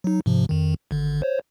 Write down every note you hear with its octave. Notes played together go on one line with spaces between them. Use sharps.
F#3 D#4
G#2 C3 F3
F2 D#3
G#1 D3
C5 C#5